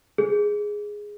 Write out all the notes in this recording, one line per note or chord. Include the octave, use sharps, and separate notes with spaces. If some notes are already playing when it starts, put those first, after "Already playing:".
G#4